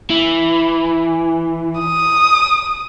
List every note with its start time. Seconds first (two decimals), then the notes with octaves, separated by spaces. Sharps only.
0.10 E3
1.79 D#6